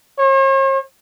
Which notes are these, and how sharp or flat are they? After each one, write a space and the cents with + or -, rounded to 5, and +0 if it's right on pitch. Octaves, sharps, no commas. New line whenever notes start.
C#5 -45